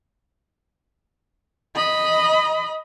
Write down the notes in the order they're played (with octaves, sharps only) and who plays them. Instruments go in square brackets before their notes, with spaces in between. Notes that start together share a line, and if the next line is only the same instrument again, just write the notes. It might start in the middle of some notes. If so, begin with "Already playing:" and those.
[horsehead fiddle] D#5 B5